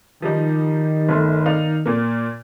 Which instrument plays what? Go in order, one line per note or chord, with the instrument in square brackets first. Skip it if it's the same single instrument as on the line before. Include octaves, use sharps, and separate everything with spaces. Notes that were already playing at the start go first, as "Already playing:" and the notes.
[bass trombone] D#3 [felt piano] F3 G3 D#4
[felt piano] G1 A3 C6
D#4 D5 F5
A#2 A#3